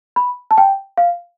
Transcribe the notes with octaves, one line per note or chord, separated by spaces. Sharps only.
B5
A5
G5
F5